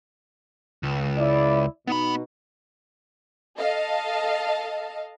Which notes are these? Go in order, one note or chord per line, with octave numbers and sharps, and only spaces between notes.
C#2
E4 D5
B2 B3 D#4 B5
A4 D#5 F5 A5